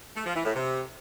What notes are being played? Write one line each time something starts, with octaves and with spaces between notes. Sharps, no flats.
A3
F3
E3
A2
C3